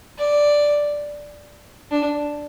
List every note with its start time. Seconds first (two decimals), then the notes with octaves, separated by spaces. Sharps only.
0.18 D5
1.91 D4